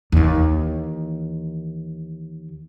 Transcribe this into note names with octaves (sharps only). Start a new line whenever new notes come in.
D#2 E3